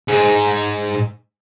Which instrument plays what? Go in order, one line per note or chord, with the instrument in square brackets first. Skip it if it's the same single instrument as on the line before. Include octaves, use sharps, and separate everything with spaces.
[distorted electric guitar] G#2 G#4